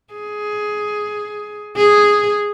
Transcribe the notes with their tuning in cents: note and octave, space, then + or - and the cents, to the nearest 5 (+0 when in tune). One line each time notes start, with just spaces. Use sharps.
G#4 +10
G#4 -5